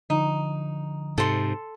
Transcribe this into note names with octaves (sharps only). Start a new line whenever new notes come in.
D3 F3 D#4
G#2 C3 A4 C6